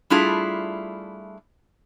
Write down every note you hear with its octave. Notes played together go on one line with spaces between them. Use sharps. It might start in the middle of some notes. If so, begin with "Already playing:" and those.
G3 A3 D4 E4 F4 G#4